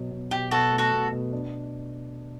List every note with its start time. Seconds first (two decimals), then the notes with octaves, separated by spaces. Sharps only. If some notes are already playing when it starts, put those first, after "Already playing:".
Already playing: B2 F#3
0.11 B2
0.31 B2 G4
0.51 B2 F#4 A4
0.72 A3
0.78 F#4 A4
0.92 B2
1.12 B2
1.32 D4